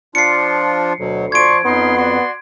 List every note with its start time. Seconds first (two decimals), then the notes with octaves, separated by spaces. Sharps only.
0.15 F3 D4 F4 C7 C#7
1.00 D2 B2 F#3
1.32 F3 D5 C6 C#6 G#6 D7
1.65 F2 B3 C#4 D#4 C6
1.97 F#4 D5 C6